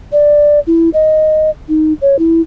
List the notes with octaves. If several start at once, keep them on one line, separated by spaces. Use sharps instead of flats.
D5
E4
D#5
D#4
C#5
E4